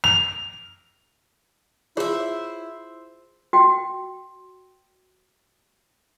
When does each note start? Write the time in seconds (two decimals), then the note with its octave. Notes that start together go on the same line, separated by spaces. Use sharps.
0.04 F7
1.97 E4 F4 G#4 C5 C#5 E5
3.53 F#4 G5